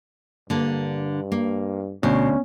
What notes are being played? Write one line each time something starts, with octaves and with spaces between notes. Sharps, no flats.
G2 D3 A#3
A#3
D2 B2 C#4